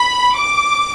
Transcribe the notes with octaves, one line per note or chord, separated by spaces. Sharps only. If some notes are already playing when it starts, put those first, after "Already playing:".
Already playing: B5
D6